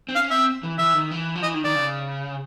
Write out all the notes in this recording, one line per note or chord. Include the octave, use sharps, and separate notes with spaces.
C4
C#4 F5
C4 E5
E3
E3 E5
D#3
E3
F3
E3 D#5
D#3
D#3 D5
C#3